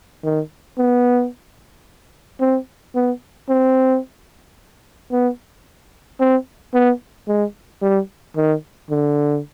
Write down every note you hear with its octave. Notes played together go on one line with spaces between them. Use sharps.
D#3
B3
C4
B3
C4
B3
C4
B3
G#3
G3
D#3
D3